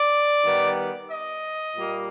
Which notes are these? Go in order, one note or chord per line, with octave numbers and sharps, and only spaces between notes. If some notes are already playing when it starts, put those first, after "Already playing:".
Already playing: D5
D#3 G3 B3
D#5
A#2 G3 A#3